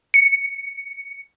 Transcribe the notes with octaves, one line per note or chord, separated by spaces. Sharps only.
C#7